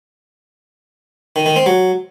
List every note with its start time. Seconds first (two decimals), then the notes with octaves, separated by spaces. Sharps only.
1.36 D#3
1.46 D#3
1.56 C4
1.66 F#3